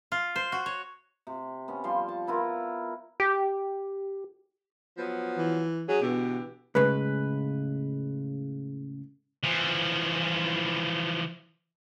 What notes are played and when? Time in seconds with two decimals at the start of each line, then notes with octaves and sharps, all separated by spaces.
0.12 F4
0.36 C5
0.52 F#4
0.66 C#5
1.27 C3
1.68 B3 C#4
1.84 F3 G3 F5 C6
2.08 A5
2.27 B3 E4 F4 A#4
3.20 G4
4.98 F3 F#3 B3
5.38 E3
5.88 F#3 C#4 G#4
6.02 B2 D3 E3 G4
6.75 A2 C#3 G#3 B4
9.43 E3 F3